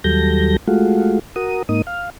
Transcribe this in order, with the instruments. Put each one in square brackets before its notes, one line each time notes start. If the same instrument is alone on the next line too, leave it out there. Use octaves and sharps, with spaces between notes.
[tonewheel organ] D#2 F#3 G3 A4 G6 A#6
G#3 A3 F4 F#4
F#4 A#4 D#6
G#2 A#3 D#4 D#6
F5